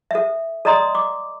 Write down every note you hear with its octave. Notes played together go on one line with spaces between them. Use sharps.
A4 E5
A4 D5 D#5 A#5 C6 D#6
D6